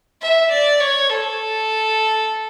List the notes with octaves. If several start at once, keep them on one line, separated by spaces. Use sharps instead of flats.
E5
D5
C#5
A4